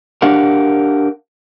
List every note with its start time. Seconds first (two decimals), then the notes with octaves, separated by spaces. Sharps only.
0.22 D4 G4 A#4 F5 F#5